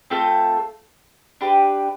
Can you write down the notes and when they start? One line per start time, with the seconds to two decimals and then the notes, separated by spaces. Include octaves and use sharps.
0.10 A3 C4 F4 A4
1.41 D4 G4 B4